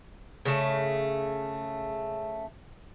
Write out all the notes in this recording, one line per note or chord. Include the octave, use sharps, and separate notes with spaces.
C#3 A3